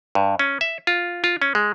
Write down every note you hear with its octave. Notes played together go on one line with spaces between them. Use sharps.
G2
C#4
E5
F4
F4
C#4
G#3